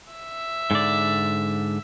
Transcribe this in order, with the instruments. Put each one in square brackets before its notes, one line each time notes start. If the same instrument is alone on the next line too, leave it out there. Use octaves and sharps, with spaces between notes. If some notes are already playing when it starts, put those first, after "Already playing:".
[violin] E5
[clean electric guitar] G#2 D3 D5